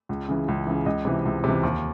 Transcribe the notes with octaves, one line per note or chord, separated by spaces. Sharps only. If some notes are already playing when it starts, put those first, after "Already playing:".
C#2
C#3 E3
C#2
C#3 E3
C#2 D#5
C3 E3
C#2
C3 E3
D#2